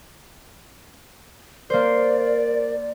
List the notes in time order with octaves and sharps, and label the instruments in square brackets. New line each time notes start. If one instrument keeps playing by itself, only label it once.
[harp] A#3 C5 [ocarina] A#4 [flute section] D5